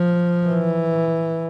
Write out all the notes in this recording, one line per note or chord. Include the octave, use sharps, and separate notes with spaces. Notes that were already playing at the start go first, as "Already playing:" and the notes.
Already playing: F3
E3